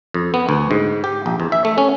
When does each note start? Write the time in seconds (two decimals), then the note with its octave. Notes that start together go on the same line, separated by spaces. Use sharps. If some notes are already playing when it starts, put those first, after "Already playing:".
0.14 F2
0.34 B3
0.49 D2
0.71 G#2
1.04 G4
1.26 A#1
1.40 E2
1.52 E5
1.65 A3
1.78 C#4